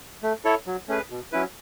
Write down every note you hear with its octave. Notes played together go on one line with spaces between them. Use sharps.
A3
E4 A4 C#5
F#3
A3 C#4 G#4 B4
B2
F#3 C#4 E4 B4